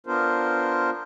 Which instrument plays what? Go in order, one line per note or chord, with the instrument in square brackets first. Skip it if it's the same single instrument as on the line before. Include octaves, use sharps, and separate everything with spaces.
[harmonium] B3 D4 F4 A#4 C5